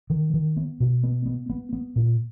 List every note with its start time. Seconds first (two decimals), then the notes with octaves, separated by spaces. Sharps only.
0.10 D#3
0.34 D#3
0.57 B3
0.80 B2
1.03 B3
1.26 B3
1.50 B3
1.73 B3
1.96 A#2